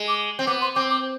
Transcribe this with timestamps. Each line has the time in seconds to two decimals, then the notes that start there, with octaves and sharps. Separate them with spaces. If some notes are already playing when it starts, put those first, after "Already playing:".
Already playing: G#3
0.08 D6
0.39 C4
0.47 B3 D6
0.61 C6
0.75 C4 D6
0.91 D6